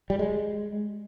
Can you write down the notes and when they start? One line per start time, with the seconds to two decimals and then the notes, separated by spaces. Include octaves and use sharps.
0.10 G3
0.19 G#3